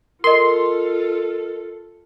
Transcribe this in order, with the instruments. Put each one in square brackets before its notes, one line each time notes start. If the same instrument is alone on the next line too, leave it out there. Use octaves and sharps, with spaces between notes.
[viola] F4 A4 [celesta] A#4 D#5 [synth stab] C6